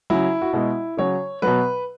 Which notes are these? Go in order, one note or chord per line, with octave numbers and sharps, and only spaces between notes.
C#3 F#3 E4
F#4
B2 G#3 E4
C#3 F#3 C#5
B2 F#3 B4